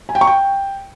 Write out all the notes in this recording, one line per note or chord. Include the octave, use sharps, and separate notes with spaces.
G#5
G5
C#6
G5